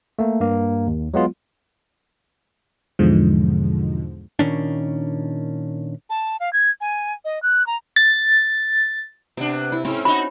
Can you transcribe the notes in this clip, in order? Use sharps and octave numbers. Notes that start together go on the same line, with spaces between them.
A3 A#3
G2 A#3
D#2
F#3 G#3 B3 F4
E2 G#2 B2 D3 F3 G#3
A#2 D#3 C#4 D4
A5
F5
G#6
G#5
D#5
F#6
A#5
A6
C3 B3 D4
E4
G#2 C4 C#4 E4
D#4 F#4 B5